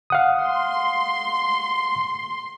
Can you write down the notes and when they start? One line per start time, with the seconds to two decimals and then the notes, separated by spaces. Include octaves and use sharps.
0.10 F5 F#5 D#6
0.44 C6